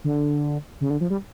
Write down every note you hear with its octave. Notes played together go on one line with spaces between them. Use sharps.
D3
C#3
D3
F3
G3